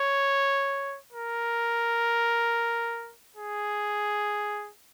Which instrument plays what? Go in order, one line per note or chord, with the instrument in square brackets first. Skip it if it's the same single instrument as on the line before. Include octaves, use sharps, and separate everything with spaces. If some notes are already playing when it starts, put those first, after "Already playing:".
Already playing: [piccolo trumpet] C#5
A#4
G#4